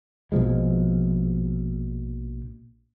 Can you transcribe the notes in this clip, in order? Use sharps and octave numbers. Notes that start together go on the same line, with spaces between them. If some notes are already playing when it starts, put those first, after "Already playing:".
A#1 B2 F3 G#3